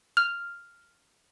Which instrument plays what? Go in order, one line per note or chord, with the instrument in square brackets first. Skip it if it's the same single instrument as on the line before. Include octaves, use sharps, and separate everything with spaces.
[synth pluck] F6